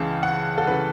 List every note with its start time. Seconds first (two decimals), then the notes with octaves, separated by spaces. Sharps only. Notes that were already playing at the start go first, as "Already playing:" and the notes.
Already playing: C#2 C#3 E3 A5
0.23 F#5
0.58 A4
0.67 C#3 E3 B4